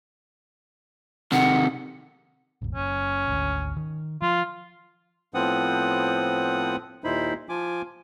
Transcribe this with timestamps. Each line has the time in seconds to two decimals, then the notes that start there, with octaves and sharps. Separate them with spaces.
1.32 C3 D#3 F#5
2.62 E1 A1
2.75 F#1 C#4
3.28 G#1 D2
3.77 D#3
4.22 F3 F4
5.34 A2 F3 B3 C4 F#5 D#6
7.04 D#2 A#2 D#4 E4 C5 B5
7.49 F3 F4 G#5 D6